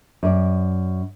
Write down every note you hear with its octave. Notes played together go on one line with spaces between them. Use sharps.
F#2 D5